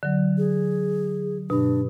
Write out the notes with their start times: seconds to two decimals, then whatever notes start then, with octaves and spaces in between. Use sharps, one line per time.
0.03 D3 F#3
0.38 G#4
1.50 G2 B2 D4